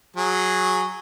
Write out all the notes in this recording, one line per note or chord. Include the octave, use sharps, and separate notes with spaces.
F#3 G#4